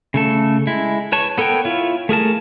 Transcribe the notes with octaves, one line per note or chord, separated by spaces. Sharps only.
C#3 A3 A4
G#3 E4
B4 C#5 A5 C#6
B3 A4 A#4 C#5 G5
E4 F4 C#5
A3 G#4 A#4 A5